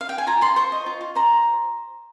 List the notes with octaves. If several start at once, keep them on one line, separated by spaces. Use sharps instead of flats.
F5
G5
G#5
F4 A#5
F4 C6
C5 C#6
D#5
F4
F4
C5 A#5